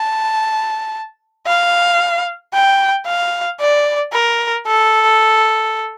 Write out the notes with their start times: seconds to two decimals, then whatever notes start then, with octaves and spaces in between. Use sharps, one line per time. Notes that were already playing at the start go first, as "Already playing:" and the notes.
Already playing: A5
1.46 F5
2.53 G5
3.07 F5
3.60 D5
4.13 A#4
4.67 A4